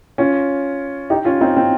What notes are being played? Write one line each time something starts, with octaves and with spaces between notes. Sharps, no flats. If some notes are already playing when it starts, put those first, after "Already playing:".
C#4 F4
D#4 G4
C#4 F4
C4 D#4
C4 D#4